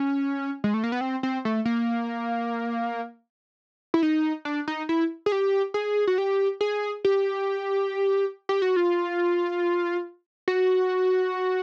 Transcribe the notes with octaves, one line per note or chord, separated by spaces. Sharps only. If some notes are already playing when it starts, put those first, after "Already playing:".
Already playing: C#4
G#3
A3
A#3
B3
C4
C4
A3
A#3
E4
D#4
D4
D#4
E4
G#4
G4
G#4
F#4
G4
G#4
G4
G4
F#4
F4
F#4